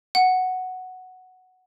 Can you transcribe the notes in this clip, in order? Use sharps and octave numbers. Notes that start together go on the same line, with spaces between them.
F#5